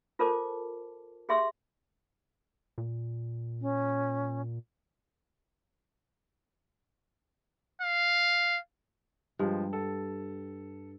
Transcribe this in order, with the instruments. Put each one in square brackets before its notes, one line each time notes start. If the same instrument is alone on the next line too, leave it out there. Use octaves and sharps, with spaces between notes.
[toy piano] F4 A4 A#4 C5 A5 D6
G4 G#4 E5 C6 E6
[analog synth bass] A#2
[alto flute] C#4
[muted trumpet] F5
[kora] G2 [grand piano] F3 G#3
[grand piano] A4